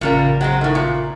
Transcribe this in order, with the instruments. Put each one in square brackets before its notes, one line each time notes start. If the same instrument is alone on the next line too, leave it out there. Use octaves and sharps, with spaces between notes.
[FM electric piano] A1 C#3 [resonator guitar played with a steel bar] A#2 G3 A#3
[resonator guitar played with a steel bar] F#3 G#3 C4
A2 D#3
A#2